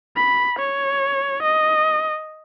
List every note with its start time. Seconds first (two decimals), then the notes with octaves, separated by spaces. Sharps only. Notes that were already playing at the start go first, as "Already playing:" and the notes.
0.17 B5
0.59 C#5
1.43 D#5